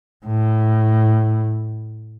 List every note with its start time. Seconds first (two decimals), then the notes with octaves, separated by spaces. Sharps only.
0.27 A2